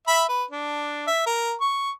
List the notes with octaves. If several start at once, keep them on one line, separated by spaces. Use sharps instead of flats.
E5 B5
B4
D4
E5
A#4
C#6